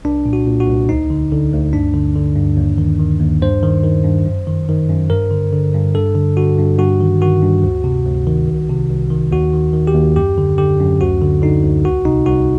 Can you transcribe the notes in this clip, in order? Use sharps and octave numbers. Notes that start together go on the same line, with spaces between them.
C2 D4
A#2
F#4
A#2
F#4
C2
D2 D#4
D3
D3
D2
G2 D4
D3
D3
G2
D#2
D#3
D#3
D#2
G2 C5
D#3
D#3
G2
F#2
D#3
D#3
F#2
G2 A#4
D3
D3
G2
G2 A4
D3
D3 F#4
G2
G2 F#4
D#3
D#3 F#4
G2
D2
C3
D2
D#3
C2
C3
C2
D#3
D#2 F#4
D#3
D#3
G4
D#2
F#2 G4
D3
D3 G4
F#2
D2 F#4
D3
D3 D#4
D2
C2 F#4
C3 D#4
C2 F#4